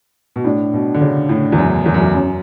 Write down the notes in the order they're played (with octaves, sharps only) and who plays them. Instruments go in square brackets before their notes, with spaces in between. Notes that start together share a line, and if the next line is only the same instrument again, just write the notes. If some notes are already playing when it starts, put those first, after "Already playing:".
[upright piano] B2
[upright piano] A2 [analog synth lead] D4
[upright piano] B2
D3
C#3
A2
E2
F#2
E2
F#2
E2
[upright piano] F#2 [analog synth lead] C#4